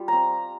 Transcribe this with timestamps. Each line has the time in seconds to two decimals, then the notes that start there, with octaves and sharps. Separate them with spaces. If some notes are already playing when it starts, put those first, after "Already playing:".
Already playing: G3 F4
0.08 C4 A#5